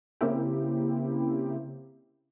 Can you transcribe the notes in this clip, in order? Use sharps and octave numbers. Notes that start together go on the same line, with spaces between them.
C#3 A#3 C4 E4 G4